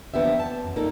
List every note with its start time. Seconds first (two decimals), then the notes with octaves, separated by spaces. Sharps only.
0.14 F3 A#3 B3 D4 G4 E5
0.40 A5
0.65 F#2
0.76 G3 A#3 D#4 A4